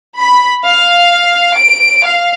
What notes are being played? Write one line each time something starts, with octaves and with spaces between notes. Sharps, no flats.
B5
F5
D7
F5